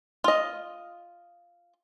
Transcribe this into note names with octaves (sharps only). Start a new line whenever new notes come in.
F4 D#5